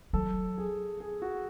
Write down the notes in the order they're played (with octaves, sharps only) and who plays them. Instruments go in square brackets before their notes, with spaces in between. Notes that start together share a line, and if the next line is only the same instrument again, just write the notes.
[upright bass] F#3 [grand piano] A4
[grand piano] G#4
G#4
F#4